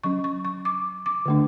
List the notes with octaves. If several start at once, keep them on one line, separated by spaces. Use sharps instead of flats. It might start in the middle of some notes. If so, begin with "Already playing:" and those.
F#3 C#4 C#6
C#6
C#6
D6
D6
D3 A3 D4